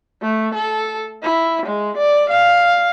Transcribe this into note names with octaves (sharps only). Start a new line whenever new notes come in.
A3
A4
E4
G#3
D5
F5